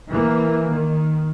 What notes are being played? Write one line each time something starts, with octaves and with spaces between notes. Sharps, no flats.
E3 A#3
D#3